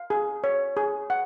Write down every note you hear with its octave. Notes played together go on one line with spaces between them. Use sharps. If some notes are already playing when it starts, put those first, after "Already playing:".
Already playing: F5
G#4
C#5
G#4
F#5